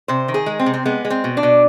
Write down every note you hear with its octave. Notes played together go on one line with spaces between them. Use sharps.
C3 C5
D#3
G#4
G#3
C4
C3
C4
G#3 B3
G#3
C4
B2
D4
B2